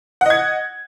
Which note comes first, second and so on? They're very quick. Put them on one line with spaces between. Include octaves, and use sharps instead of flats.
F#5 D#5 G#6